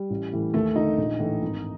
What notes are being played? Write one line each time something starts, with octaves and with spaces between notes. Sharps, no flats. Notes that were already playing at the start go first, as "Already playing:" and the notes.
Already playing: G3
A1
A2 E3
D#2 A3
D3 D#4
A#1
A2 E3
G#1